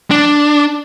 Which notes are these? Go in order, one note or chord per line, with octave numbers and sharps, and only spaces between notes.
D4